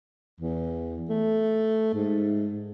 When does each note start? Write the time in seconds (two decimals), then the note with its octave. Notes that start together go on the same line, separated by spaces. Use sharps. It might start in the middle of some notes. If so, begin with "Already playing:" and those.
0.40 E2
1.09 A3
1.94 G#2